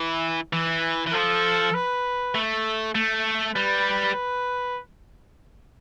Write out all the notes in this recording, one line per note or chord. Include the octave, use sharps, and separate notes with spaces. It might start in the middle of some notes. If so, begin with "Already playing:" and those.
Already playing: E3
E3
E3
F3 A4
B4
A3
A3
G3 B4